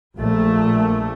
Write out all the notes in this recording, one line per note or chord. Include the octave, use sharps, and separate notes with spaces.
A#1 A#2 A3